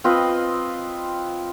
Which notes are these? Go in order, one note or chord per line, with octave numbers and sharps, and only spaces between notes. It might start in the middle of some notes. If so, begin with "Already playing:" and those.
C4 F4 B4 D#5